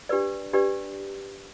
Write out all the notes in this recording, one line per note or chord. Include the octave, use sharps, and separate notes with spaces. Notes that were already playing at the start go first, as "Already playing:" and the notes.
D4 G4 B4 D5
D4 G4 B4 D5